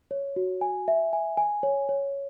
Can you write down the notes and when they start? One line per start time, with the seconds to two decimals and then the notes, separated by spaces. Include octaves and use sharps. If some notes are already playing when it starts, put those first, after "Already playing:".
0.11 C#5
0.36 F#4
0.61 G#5
0.88 E5
1.13 G#5
1.37 G#5
1.63 C#5
1.89 C#5